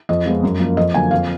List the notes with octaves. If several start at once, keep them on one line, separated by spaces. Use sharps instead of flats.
F2 D#5
F3 G#3 B3
F#2
F3 A#3
F2 D#5
D3 F#3 A#3 G#5
F2 F5